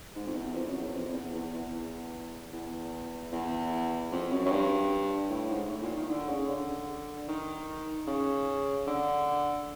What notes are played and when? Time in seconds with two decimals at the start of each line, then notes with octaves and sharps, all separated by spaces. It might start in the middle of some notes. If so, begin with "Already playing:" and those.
0.15 G#2
0.27 F2
0.35 E2
0.54 F2
0.68 F#2
0.81 E2
0.94 F2
1.13 E2
1.34 E2
1.54 E2
2.53 E2
3.32 E2
4.12 F2
4.31 F#2
4.45 F#2
4.51 G2
5.30 A2
5.50 G#2
5.70 A2
5.83 A#2
5.97 D#3
6.10 D3
6.29 C#3
6.50 D3
7.28 D#3
8.07 C#3
8.87 D3